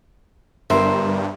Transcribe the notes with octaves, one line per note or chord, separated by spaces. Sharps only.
G1 G2 A#4 C5 E5